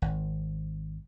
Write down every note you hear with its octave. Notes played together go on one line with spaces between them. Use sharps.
G#1